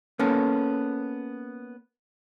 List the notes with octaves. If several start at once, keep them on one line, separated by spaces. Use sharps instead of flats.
A#3 B3 C#4 A4